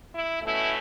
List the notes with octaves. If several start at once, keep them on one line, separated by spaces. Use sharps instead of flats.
E4
B2 A3 C#4 E4